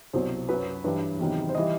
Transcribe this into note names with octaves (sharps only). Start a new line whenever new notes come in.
C2 B2 F#3 C5
F#2 F#3 B4
G2 E3 G3 B4
E2 C3 D#3 F#3
C5
E3 G3 D#5